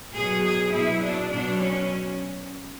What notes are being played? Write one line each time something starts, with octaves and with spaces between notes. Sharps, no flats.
B2 F#3 G#4
G#4
B2 F#3 E4
D4
B2 F#3 D4
C#4